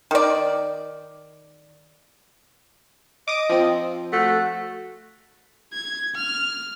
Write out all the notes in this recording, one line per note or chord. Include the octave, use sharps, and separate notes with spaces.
D#3 D5
D#5 D6 D#6 D7
F3 C4
A3 F#4
G#6
F6